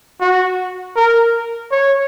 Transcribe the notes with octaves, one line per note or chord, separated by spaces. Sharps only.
F#4
A#4
C#5